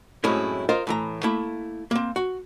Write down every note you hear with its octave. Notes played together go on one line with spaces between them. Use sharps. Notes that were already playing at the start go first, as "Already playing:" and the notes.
F#2 A2 G#3 C4 C#4 E4
F4 A#4 C5 D#5 F5
A2 E3 A#5
A3 A#3 E4
A#3 C4
F#4